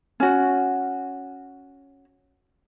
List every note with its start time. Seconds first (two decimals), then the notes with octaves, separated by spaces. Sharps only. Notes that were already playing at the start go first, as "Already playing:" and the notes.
0.20 C#4 F#4